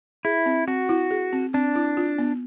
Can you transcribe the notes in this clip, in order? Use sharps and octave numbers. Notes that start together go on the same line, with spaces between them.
E4 G#4
C4
C4 F#4
E4
G#4
C4
C4 D4
E4
F4
B3